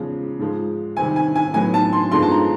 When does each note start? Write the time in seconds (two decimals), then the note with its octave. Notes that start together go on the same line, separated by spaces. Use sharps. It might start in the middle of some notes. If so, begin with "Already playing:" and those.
Already playing: E2 C#3 F3 G#3
0.39 G#2 F3 G#3
0.97 C3 D#3 G3 C4 G#5
1.16 G#5
1.36 G#5
1.54 A2 F#3 B3 G#5
1.74 A5
1.93 C6
2.12 G2 D3 F3 G#3 B3 C6
2.23 A5
2.31 A#5